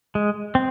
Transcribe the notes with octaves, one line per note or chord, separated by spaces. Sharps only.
G#3
C4